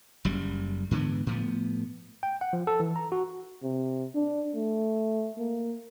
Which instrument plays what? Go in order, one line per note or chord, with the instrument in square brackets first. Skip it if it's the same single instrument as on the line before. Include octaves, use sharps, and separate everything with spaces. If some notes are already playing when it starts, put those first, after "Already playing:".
[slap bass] F#1 F#2 G3
G#2 D3 E3 B3
A2 F3 B3
[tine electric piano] G5
F#5
F3
A4
E3
A#5
F#4
[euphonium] C3
D4
A3
A#3